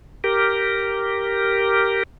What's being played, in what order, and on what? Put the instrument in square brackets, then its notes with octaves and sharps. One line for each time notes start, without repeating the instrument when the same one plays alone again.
[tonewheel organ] G4 A#4